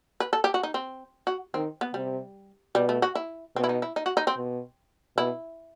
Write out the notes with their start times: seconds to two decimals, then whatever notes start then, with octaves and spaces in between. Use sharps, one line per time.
0.20 B4
0.33 A4
0.44 G4
0.54 F#4
0.63 D#4
0.74 C4
1.27 F#4
1.54 D#3 C4
1.81 B3
1.94 C3 G3
2.75 B2 G3
2.89 A3
3.02 F#4
3.15 E4
3.56 B2 C4
3.64 E4
3.69 D#4
3.82 E4
3.96 D#4
4.06 F#4
4.17 D#4
4.27 C4
4.37 B2
5.18 B2 E4